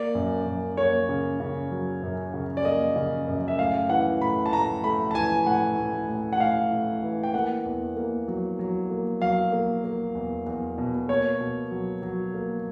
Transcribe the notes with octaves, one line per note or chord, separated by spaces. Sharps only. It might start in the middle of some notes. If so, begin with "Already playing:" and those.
Already playing: A#3 D5
F#2
F#2
A#3 C#5
C#3
C#3
F#3
F#2
C#3
D5
A#3 D#5
C#3
F#2
E5
A2 F5
E3 F#5
A2 B5
A5
A2 A#5
A3 B5
A5
E3 G#5
A2 F#5
A2
A2
F#5
A2 F5
A2
E3
G5
A#3 F#5
E2
A#3
F#3
F#3
A#3
F#3 F5
A#3
A#3
E2
E2
B2
A#3 C#5
B2
F#3
F#3
A#3